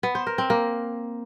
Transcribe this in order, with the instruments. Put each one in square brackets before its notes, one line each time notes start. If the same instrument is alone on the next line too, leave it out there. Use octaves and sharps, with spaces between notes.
[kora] B3
C5
A#4
C4
A#3